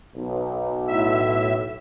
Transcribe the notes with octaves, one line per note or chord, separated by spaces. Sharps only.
B1
A2 E5 E6